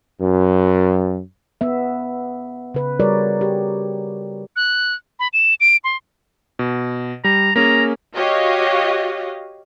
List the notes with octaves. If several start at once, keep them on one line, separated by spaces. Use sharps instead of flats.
F#2
B3 E5
C#3 B4
G3 F#4 G#4 A#4 C#5 D5
G4
F#6
B5
E7
D7
C6
B2
G3 A#5
A#3 C#4 G#4 A#5
F#4 G4 C#5 D#5 F5